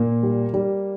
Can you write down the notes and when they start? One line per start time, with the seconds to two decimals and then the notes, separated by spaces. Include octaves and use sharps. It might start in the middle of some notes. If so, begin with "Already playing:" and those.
Already playing: A#2 A#3
0.23 G3
0.54 G3